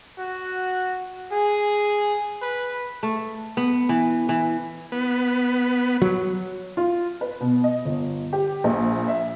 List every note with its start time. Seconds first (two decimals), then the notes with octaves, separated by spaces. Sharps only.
0.18 F#4
1.32 G#4
2.42 B4
3.03 A3
3.57 B3
3.89 E3
4.29 E3
4.92 B3
6.02 F#3
6.77 F4
7.21 B4
7.40 B2
7.64 D#5
7.85 G1
8.33 G4
8.64 A#1
9.08 E5